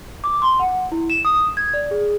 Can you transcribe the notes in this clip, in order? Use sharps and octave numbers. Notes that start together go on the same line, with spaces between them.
D6
C6
F#5
E4
E7
D#6
G#6
D5
G#4